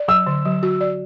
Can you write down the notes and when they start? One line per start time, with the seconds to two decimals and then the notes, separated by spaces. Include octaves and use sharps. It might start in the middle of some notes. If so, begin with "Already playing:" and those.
Already playing: D5
0.08 F#3 E6
0.27 D3
0.45 F#3
0.63 F#4
0.81 D5